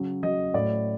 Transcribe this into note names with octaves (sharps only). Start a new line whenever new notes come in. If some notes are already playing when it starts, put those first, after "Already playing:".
Already playing: C#3 F#3
F#3 D#5
A2 D5